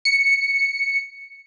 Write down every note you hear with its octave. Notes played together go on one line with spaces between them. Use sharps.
C#7